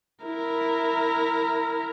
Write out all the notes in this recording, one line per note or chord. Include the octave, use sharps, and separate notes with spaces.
E4 A#4